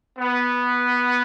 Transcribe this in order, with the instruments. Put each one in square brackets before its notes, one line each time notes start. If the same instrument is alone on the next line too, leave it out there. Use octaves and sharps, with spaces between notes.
[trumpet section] B3